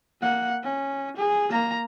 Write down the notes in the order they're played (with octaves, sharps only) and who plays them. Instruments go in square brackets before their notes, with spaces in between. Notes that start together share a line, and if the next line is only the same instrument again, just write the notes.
[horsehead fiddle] A#3 F#5
C#4
G#4
A#3 A#5